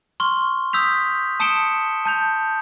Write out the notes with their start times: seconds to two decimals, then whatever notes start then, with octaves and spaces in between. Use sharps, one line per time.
0.20 C6 C#6 F6 G7
0.73 D#6 E6 G6 B6 F7
1.40 A5 D#6 C#7 D7 E7 G7
2.05 A5 G6 F7